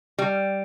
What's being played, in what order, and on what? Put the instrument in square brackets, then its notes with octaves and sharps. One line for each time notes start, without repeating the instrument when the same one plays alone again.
[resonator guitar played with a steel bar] G3